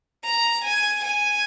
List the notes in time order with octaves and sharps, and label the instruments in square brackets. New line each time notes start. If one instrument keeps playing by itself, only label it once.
[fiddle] A#5
G#5
G#5